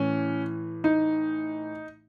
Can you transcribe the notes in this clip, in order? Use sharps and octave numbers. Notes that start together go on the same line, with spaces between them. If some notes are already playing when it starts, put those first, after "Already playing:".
Already playing: A2 E3 C#4
D#4